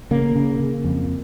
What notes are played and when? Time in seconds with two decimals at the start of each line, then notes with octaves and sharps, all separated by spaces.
0.11 C#3 A#3
0.36 C#3
0.60 C#3
0.84 F2